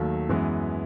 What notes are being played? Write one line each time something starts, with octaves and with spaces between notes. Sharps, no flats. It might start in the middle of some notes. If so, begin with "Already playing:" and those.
Already playing: D#2 D#3 F#3 A3
F#2 E3 G#3 B3